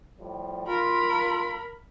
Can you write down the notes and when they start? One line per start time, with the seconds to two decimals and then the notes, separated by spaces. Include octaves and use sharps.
0.19 A2 F3 G3
0.67 F4 A#4 B5